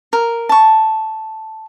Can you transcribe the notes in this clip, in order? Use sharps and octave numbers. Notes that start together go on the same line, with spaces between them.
A#4
A5 C#6